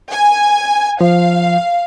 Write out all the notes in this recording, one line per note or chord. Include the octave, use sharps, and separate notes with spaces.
G#5
F3 F5